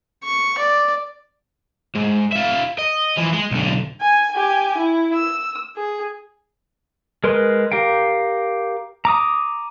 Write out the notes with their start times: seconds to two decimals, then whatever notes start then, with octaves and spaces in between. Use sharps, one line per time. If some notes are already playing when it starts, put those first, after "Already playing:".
0.24 C#6
0.58 D5
1.95 G#2
2.32 F4 E5
2.79 D#5
3.18 E3 F3
3.33 G#3
3.51 B1 D3
4.01 G#5
4.32 G4 G#5
4.77 E4
5.14 E6
5.76 G#4
7.24 G#3 A#4 B4 C6
7.72 G4 A#4 F5 G5
9.05 A#5 D6 D#6